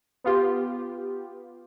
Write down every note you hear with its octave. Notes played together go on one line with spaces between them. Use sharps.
B3 F4 G4